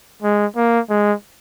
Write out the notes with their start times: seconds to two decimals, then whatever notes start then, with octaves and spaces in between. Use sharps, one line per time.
0.22 G#3
0.56 A#3
0.90 G#3